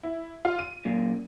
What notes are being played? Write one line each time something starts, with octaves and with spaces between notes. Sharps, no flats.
E4
F4 F5
D#7
F#2 A#2